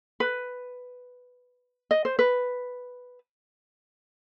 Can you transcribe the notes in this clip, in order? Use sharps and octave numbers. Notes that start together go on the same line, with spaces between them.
B4
D#5
C5
B4